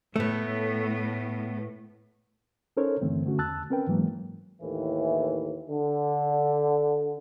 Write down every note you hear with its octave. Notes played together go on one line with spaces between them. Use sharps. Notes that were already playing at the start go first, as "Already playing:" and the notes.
A2 A3 B3
C#4 D#4 A4 A#4 C5 C#5
G2 D3 E3 A3 C4
D3 A3 C#4 F#4
E2 A5 E6 F#6 A6
C4 C#4 A#4 B4 G5
G#2 E3 F#3 G#3 A#3
D#2 A2 E3
D3